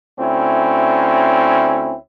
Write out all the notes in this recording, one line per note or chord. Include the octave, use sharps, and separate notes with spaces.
D2 C4 C#4 E4